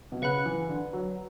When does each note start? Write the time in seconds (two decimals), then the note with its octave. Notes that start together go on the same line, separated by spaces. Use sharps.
0.12 B2
0.22 C#3 B4 F#5 B5 F#6
0.46 E3
0.69 D3
0.93 F#3